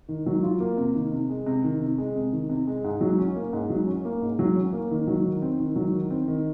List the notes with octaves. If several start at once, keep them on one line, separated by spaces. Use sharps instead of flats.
D#3
F#3
F4
A#3
C3
D#3
C3
G#3
C3
D#3
C3
G#3
C3
D#3
C3
G#3
G#2
F#3
C#4
A#3
G#2
F#3
C#4
A#3
G#2
F#3
C#4
A#3
D#3
F#3
D#3
C4
D#3
F#3
D#3
C4
D#3